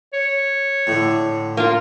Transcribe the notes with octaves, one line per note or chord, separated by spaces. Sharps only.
C#5
A2 D3
A#3 F4